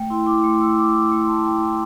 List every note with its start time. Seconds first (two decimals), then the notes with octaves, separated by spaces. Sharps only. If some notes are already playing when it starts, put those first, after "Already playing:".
Already playing: A3 G5
0.10 E4 C6
0.26 E4 D6
0.44 A3 C6
0.60 A3 E6
0.78 E4 D6
0.94 E4 D6
1.11 A3 D6
1.23 C6
1.28 A3 A5
1.46 E4 G5
1.63 E4